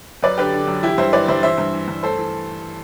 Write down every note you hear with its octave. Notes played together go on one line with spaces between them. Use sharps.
F#2 B4 D5
D3 G4 B4
D3
F#2
E3 E4 G4
G2 C5 E5
E3 B4 D5
G2 C5 E5
E3 C5 E5
G2
E3
G2
A3 A4 C5
E3